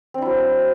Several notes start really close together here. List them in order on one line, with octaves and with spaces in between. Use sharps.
C4 D4 E4 F#3